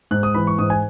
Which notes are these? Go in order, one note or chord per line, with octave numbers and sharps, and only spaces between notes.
G#2 F#6
D#6
E3 B5
C#6
G#2 D#6
G#5